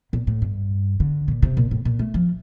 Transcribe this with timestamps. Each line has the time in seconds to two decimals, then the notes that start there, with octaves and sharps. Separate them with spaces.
0.13 A#2
0.27 A2
0.42 G2
1.00 D3
1.28 A#2
1.42 C3
1.57 A#2
1.71 A2
1.85 A#2
1.99 A3
2.14 F3